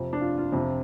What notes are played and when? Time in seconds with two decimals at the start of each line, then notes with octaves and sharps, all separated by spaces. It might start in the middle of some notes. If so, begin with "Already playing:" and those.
Already playing: F2 C3
0.13 D4
0.21 F4
0.37 F4
0.52 F2 C3